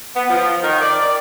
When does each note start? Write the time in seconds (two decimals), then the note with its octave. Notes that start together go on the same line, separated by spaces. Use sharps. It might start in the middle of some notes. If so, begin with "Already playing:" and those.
0.16 B3
0.29 F3
0.63 D#3
0.81 D5
1.00 D5